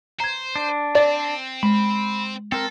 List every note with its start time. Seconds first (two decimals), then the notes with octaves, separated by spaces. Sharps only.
0.20 C5 A#5 G#6
0.56 D4
0.95 C4 D5
1.63 G#3 B5
2.52 C4 A4 A#4